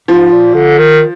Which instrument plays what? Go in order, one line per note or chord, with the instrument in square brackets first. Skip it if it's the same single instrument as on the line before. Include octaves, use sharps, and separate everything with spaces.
[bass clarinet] G#2 [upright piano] F3
[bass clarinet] A#2
D3
D#3